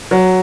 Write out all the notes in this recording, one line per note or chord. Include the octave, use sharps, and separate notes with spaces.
F#3